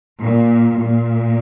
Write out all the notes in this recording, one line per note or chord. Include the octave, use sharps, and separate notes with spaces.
A#2
A#2